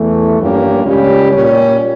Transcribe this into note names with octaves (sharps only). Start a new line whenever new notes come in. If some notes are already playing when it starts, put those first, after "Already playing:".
Already playing: E2 E3 A3
G2 F3 A#3 C#4 G4
C#2 C#3 G3 C#4 G4
A#2 G3 C#4